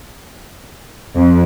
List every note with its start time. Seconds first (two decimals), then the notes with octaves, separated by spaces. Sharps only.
1.16 F2